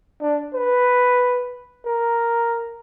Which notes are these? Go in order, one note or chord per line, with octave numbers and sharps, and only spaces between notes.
D4
B4
A#4